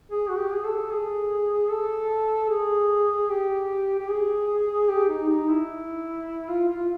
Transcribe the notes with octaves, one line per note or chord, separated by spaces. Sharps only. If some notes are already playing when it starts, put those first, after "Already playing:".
G#4
F#4
G4
G#4
A4
G#4
A4
G#4
G4
G4
G#4
G4
D#4
D#4
E4
F4
F4